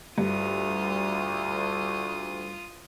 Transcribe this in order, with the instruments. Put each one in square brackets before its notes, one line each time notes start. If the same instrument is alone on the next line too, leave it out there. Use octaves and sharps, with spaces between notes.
[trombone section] D2 [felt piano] G2 [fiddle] F4 D#6